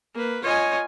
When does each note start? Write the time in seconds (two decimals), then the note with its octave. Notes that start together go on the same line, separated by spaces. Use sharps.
0.14 A#3 B4
0.43 F4 C#5 D#5 G#5